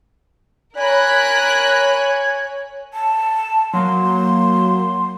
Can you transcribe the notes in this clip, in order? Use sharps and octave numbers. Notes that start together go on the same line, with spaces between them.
A#4 C#5 G#5 B5 F#6
A5
F#3 A#3 C6